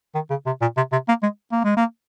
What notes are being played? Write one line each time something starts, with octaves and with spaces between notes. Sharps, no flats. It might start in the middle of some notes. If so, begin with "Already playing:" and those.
D#3
C#3
C3
A#2
C3
C3
A#3
G#3
A#3
G#3
A#3